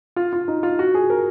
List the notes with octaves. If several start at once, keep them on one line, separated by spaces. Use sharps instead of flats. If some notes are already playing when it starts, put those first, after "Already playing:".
F4
F4
D#4
F4
F#4
G#4
A#4